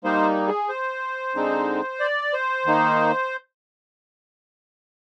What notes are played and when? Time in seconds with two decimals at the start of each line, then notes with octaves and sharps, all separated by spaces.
0.04 G3 A#3 D#4 C5
0.48 G#4
0.69 C5
1.35 D3 G#3 C4 D#4
2.00 D5
2.33 C5
2.66 D#3 A#3 D#4